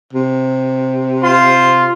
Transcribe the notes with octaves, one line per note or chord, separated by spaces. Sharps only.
C3
F4 C5 C6